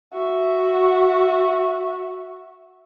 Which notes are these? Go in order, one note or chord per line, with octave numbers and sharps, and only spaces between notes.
F#4 E5